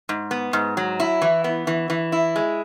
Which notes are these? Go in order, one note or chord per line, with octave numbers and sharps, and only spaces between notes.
G#2
B3
G#2
F#3
E4
E3
B3
E3
E3
E4
G#3